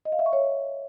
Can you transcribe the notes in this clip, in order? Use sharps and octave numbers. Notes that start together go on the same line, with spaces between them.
D#5
F5
E5
C#6
C#5